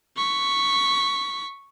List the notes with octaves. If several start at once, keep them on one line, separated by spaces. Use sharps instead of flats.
C#6 B6